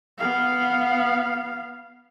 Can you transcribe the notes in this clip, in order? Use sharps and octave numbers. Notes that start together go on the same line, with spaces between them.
B3 F5